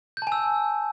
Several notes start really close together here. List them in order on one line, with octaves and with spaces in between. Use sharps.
G6 A5 G#5 E6